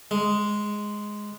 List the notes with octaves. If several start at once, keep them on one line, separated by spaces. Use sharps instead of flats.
G#3